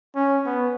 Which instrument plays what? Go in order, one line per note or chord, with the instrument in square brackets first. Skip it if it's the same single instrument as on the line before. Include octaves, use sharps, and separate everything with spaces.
[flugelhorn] C#4
B3